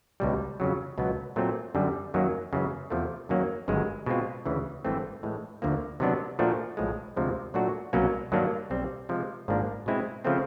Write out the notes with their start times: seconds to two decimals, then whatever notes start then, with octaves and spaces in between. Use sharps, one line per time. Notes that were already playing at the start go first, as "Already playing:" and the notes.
0.20 C#2 B2 G3
0.60 F2 C#3 F#3
0.98 C#2 B2 F#3 B3
1.36 A#2 F#3 A3 C4
1.75 F#2 D3 G3
2.14 F#2 D#3 F#3 A#3
2.53 F#2 C#3 E3 G#3
2.90 E2 C3 F3 A3
3.29 F#2 D#3 F#3 A#3 C#4
3.68 G1 F#2 D#3 G#3
4.06 B2 G#3 C4 F4
4.46 D2 C#3 E3
4.85 G#1 G2 E3 A3 C4
5.23 A2 E3 G#3
5.62 D2 D3 F3 A#3
6.00 C3 D#3 F#3 B3 D4
6.39 A#2 F3 A3 D4 F#4
6.77 B1 A2 F3 G#3
7.16 D2 C3 F3 G#3
7.54 A#2 F#3 A3 D4 F#4
7.93 C2 B2 F#3 A#3 C#4
8.32 G2 D#3 F#3 A#3 D4
8.70 B1 B2 G3 C4
9.09 C3 F3 G#3
9.48 G#1 G#2 F3 A#3 D4
9.86 B2 G#3 C4 E4
10.25 C#3 F3 A3 C4